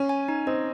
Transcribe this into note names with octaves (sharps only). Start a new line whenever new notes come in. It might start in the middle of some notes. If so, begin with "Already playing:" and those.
Already playing: C#4
G#5
D#4
C4 D#5